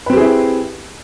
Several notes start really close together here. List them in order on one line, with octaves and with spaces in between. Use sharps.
B4 C4 G4 G#4 E4